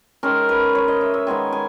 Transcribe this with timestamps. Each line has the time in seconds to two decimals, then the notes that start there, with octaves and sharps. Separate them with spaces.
0.23 D#3 G#3 C#4 A#4
0.49 B4
0.75 C#5
0.88 D#5
1.01 E5
1.14 E5
1.27 D#3 G#3 B3 D#4 G#5
1.53 G#5